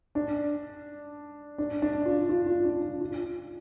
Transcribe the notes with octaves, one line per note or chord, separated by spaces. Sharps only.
D4
D4
D4
F4
F4
F4
D4
D4
F4